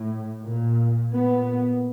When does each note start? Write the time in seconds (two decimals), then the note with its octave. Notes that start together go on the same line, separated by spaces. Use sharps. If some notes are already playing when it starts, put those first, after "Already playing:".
Already playing: A2
0.42 A#2
1.13 A#2 B3